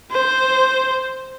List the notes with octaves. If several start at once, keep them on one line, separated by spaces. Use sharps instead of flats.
C5